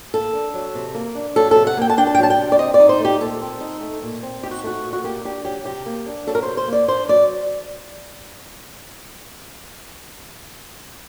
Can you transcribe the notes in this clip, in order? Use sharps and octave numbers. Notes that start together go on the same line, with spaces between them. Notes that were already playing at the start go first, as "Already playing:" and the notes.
A#3 A4
D4
F#3
C3
A#3
D4
F#3 A4
C3 A4
F#5
A#3 G5
A5
D4 G5
A5
G5
F#3 A5
G5
C3
D5
C4 D#5
D5
D#4
C5
A3
G4
A#2 A4
C4
D#4
A3
A#2
C4
D#4 G4
F#4
A3 F#4
A#2
F#4
A#3 G4
D4 G4
F#3 G4
C3 G4
A#3
D4
F#3 A4
A#4
C3 C5
C5
A#3
D5
D4 C5
F#3 D5